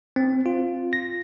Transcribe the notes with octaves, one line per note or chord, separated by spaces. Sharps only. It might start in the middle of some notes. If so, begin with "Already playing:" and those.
C4
F4
A#6